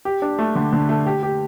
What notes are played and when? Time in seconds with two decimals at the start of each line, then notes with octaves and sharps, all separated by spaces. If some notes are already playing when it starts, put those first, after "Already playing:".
0.05 G4
0.22 D4
0.39 A3
0.55 D3
0.73 D3
0.89 A3
1.06 G4
1.23 G4